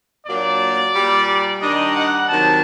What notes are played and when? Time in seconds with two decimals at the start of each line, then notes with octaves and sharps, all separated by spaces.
0.27 A#2 F#3 A#3 D4 D5
0.94 A#2 G3 A#3
1.61 D#3 G3 D4 D#5
1.95 F#5
2.29 C3 D#3 F#3 A5